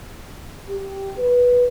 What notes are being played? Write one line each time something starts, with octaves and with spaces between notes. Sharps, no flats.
G4
B4